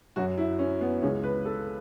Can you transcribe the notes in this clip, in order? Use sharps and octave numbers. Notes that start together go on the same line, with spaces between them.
F#2 F#3 F#4
E4
C#4
B3
C#2 C#3 E3 C#4
B4
A4